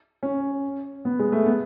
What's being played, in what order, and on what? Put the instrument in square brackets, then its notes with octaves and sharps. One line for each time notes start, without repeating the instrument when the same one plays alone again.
[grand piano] C#4
B3
G#3
A3
B3